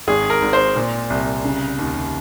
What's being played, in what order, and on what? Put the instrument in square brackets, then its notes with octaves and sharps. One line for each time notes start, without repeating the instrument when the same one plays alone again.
[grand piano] G#1 G#4
A#4
G#1
C5
A#2
C2
C#3
D#2